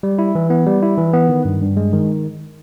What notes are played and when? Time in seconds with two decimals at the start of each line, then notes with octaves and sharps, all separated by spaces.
0.03 G3
0.19 E4
0.35 E3
0.50 B3
0.66 G3
0.83 E4
0.98 E3
1.14 B3
1.29 D#3
1.45 G2
1.61 G2
1.77 G#3
1.93 D#3